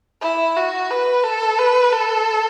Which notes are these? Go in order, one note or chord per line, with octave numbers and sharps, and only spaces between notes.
E4
F#4
B4
A4
B4
A4